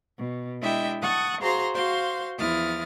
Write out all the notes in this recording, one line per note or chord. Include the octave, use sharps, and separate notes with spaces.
B2
G#3 D4 E4 D#5 E5 G5
F#5 A5 C#6 D#6 F#6
F#4 G#4 C5 F5 A#5 C6
F#4 C5 F5 C6
E2 F3 E4 D#6 F6 A6